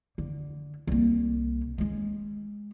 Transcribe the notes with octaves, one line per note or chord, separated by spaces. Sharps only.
D3
C2 A#3
G#3 C#4